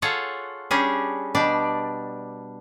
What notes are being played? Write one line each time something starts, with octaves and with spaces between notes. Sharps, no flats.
F4 G#4 A4 C#5 F#5
G3 C#4 D4 G#4
B2 G3 D4 D5